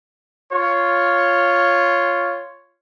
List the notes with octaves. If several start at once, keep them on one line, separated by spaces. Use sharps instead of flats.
F4 C#5